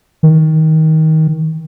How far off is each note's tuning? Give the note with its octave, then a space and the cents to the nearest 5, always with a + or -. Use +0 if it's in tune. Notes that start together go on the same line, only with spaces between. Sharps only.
D#3 +20